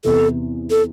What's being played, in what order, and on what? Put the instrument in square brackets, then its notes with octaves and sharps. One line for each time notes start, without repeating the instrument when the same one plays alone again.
[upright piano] E2 C3 E3 [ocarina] A4
[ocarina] A4